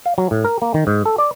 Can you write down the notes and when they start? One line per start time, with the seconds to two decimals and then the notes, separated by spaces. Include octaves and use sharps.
0.06 F5
0.18 F#3
0.31 A2
0.45 A#4
0.62 A#3
0.74 D#3
0.87 G#2
1.05 A4
1.18 D5